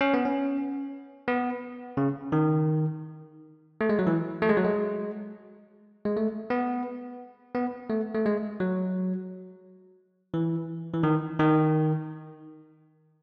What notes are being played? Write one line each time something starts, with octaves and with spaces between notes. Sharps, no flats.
C#4
B3
C#4
B3
C#3
D#3
A3
G#3
F#3
E3
A3
G#3
F#3
G#3
G#3
A3
B3
B3
A3
A3
G#3
F#3
E3
E3
D#3
D#3